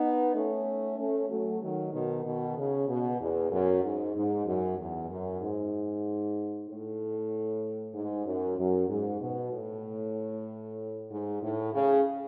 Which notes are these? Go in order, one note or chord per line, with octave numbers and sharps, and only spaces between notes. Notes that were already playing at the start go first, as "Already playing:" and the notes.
Already playing: B3 D#4
A3 C#4
A3 C#4
F#3 A3
D#3 F#3
B2 D#3
B2 D#3
C#3
B2
E2
F#2
G#2
G#2
F#2
E2
F#2
G#2
A2
G#2
F#2
F#2
G#2
B2
A2
G#2
A2
C#3